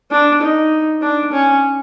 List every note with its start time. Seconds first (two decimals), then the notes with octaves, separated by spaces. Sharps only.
0.11 D4
0.42 D#4
1.02 D4
1.32 C#4